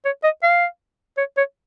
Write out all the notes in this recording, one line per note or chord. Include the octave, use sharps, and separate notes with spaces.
C#5
D#5
F5
C#5
C#5